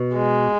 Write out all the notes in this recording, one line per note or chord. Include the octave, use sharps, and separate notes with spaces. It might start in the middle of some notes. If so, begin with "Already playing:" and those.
Already playing: B2
G#3